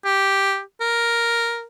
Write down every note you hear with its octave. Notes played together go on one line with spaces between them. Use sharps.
G4
A#4